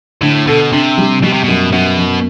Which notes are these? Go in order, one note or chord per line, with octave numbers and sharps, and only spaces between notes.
A2 D3
B2 A4
C3 D4
G3
B2 G3
C3
F#2 B2
F#2 B2
F#2